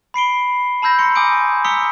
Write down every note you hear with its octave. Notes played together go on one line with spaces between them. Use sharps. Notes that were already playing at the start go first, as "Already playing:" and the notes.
B5 C7 D7 G7
A5 B5 E6 G6 A#6
A#5 C6 C#7
G#5 D6 D#6 G6 D7
A#5 D#6 E6 B6 C#7 G7